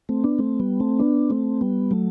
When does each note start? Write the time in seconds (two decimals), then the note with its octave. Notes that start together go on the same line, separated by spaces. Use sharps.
0.09 A3 C4
0.24 B3 D4
0.39 A3 C4
0.60 G3 B3
0.80 A3 C4
0.99 B3 D4
1.30 A3 C4
1.61 G3 B3
1.91 F#3 A3